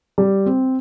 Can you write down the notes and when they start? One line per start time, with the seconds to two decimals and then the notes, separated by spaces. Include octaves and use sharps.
0.18 G3
0.46 C4